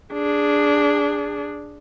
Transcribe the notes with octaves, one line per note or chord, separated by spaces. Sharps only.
D4 G#4